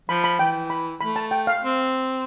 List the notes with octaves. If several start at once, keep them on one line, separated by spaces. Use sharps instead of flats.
F3 B5
B5
E3 G5
B5
A3 B5
A5
G5
F5
C4